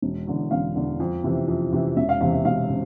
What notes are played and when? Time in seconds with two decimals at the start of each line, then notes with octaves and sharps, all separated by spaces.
0.02 E1
0.27 E2 D3
0.51 E1 F5
0.75 E2 D3
1.00 F2
1.24 C3 E3
1.48 F2
1.72 C3 E3
1.97 E1 E5
2.09 F5
2.21 E2 C3 E3 F5
2.33 E5
2.45 E1 F5
2.69 C3